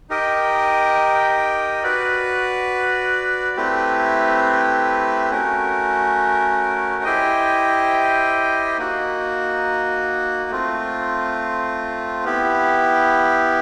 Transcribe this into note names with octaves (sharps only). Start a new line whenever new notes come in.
D#4 G4 A#4 D#5 G5
F#4 B4 D5
A3 C4 E4 G4 B4
A3 C#4 F#4 A#4
E4 G4 C5 D#5 G5
A#3 D#4 F#4
A3 C4 F4
B3 E4 G4